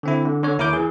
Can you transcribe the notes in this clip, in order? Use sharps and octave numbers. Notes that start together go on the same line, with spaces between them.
D3 C4 E4
D3
D3 C#5
D#2 E4 A#4 C#5 D6 G6
E3 G#4